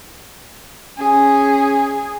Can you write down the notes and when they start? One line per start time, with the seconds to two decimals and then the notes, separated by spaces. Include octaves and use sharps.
0.98 C#4 G#4